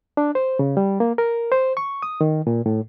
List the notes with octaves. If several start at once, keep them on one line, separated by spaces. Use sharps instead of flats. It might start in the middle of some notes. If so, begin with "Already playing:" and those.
D4
C5
C#3
G3
A#3
A#4
C5
C#6
D#6
D#3
A#2
A2